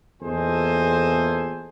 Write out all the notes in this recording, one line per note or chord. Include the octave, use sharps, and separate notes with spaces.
E2 A#2 A4 C5 D#5 G#5